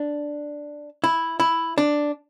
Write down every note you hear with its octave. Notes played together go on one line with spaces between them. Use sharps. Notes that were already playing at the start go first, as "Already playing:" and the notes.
Already playing: D4
E4
E4
D4